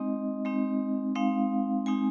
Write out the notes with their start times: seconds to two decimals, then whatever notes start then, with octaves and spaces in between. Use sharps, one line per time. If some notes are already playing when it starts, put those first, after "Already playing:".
Already playing: G#3 C4 D#4 D#5
0.45 G#3 C4 D#4
1.15 G#3 C4 D#4 F5
1.86 G#3 C4 D#4 G#5